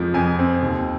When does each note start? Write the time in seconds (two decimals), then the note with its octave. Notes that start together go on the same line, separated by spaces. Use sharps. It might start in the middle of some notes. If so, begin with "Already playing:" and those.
Already playing: F2 F3 G#3
0.14 F2 G#5
0.39 C4
0.62 D#2